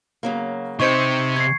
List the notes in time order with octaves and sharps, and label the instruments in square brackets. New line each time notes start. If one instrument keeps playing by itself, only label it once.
[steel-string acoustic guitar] C#3 F#3 A#3
[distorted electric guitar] C3 [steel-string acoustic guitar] D#4 C5 G5 [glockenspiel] C#6 G#6 C#7
[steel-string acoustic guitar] F2 [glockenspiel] G#6 C7